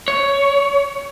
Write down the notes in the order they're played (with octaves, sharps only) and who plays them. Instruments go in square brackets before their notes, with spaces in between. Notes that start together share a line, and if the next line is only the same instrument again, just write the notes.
[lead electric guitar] C#5